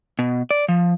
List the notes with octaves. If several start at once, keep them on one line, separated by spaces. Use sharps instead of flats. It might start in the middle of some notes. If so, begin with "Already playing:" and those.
B2
D5
F3